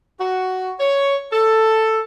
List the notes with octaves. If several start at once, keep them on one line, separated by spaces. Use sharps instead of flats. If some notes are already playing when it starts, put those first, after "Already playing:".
F#4
C#5
A4